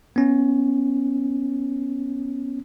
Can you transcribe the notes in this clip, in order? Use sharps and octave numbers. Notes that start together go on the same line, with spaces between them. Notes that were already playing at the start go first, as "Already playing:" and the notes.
B3 C#4